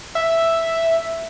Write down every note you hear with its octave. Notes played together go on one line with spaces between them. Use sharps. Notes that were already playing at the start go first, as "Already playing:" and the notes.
E5